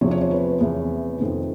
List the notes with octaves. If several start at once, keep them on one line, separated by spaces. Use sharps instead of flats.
E2 C3 F3 C#5
C#5
C#5
B4
E2 C3 E3
F2 C3 D#3